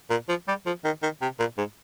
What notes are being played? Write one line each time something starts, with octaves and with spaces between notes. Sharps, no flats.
A#2
F3
G3
F3
D#3
D#3
C3
A#2
G#2